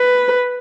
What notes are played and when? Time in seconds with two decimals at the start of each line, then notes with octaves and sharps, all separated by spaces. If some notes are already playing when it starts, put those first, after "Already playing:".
Already playing: B4